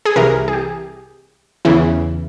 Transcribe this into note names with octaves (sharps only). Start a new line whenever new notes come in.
G#4
C2 C3 E3 A#4
G#4
G4
E2 C#3 E3